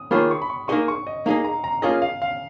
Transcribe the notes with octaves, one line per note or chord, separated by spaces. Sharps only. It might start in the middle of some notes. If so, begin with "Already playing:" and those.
Already playing: D#6
D#3 A#3 F4 G#4 C#5 B5
C#6
B5
C#6
A#3 D#4 G#4 D#5 C#6
C#6
D#5
A#3 D#4 G#4 D#5 F5
A#5
A#5
A#3 C#4 F4 G#4 D#5 G#5
F5
F5